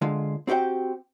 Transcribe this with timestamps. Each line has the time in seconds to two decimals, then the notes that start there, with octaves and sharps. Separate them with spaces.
0.02 D3 G#3 F4
0.47 C4 F#4 G4 D#5 G5